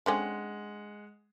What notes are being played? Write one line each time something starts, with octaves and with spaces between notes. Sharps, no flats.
D3 G#3 C4 C#4 F#5